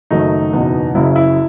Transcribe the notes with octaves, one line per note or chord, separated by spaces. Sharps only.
F#1 F#2 D#3 F#3 A3 D#4
F#1 E2 B2
F#1 F#2 C#3 E4
E4